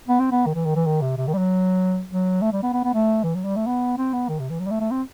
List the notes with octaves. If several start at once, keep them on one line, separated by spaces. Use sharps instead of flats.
B3
C4
B3
D#3
E3
D#3
E3
D#3
C3
C3
D#3
G3
F#3
F#3
A3
G3
B3
B3
B3
A3
E3
F#3
G3
A3
B3
C4
B3
D#3
C3
E3
F#3
G3
A3
A3
C4